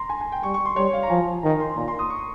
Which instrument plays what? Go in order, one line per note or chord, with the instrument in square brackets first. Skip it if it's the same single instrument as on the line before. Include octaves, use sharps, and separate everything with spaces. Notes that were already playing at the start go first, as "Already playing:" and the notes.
Already playing: [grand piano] A#5 C6
G#5
G#5
G5
[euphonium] G3 [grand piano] C#6
[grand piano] C#6
C6
[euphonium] G3 [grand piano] C#5
[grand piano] F5
A#5
[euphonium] F3 [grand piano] G#5
[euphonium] D#3 [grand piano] A#5
[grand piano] C6
[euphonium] A#2 [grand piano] A#5
[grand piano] C6
D#6
C#6